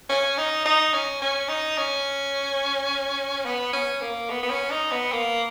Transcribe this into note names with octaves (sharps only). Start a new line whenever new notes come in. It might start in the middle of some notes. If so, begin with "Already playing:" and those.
C#4
D#4
D#4
C#4
C#4
D#4
C#4
B3
C#4
A#3
B3
B3
C#4
D#4
B3
A#3